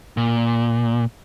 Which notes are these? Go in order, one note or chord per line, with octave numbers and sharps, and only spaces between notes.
A#2